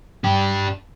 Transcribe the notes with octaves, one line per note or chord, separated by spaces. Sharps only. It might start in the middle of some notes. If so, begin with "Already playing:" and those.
D4 G4